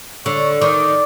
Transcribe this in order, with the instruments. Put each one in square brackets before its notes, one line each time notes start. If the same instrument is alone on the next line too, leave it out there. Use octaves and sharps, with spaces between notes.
[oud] D3 [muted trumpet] C#5
[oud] D#3 [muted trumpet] D5